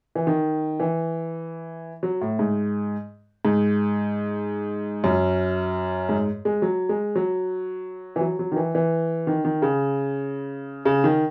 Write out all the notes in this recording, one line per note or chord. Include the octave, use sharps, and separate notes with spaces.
E3
D#3
E3
F#3
A2
G#2
G#2
F#2
G#2
G#3
F#3
G#3
F#3
E3
F#3
F#3
D#3
E3
E3
D#3
D#3
C#3
C#3
D#3